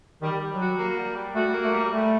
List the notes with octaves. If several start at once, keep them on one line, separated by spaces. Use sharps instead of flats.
D#3 G3
G3
F#3
F#4
A#3
G3
G3
A3 F#4
A#3
A3
G3
G3 A3